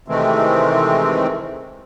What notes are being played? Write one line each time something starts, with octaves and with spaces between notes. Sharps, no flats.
C3 D#3 E3 G#3 A3 C4